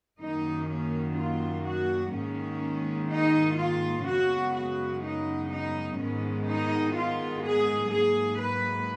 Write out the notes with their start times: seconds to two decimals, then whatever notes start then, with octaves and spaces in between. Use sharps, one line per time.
0.19 F#2 D#3 A#3 D#4
0.68 C#4
1.16 F4
1.64 F#4
2.12 G#2 D#3 A#3 C#4
3.09 D#4
3.57 F4
4.05 F#2 C#3 G#3 B3 F#4
4.54 F#4
5.02 D#4
5.50 D#4
5.98 G#2 D#3 G#3 B3 C#4
6.46 D#4
6.94 F4
7.43 G#4
7.91 G#2 F#3 A#3 G#4
8.39 B4